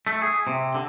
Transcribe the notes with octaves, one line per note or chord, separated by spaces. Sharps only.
A3
G#4
C3
D3